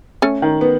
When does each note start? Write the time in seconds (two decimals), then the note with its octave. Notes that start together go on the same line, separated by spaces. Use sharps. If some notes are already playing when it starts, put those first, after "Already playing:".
0.22 A3 C#4
0.42 D#3
0.61 B3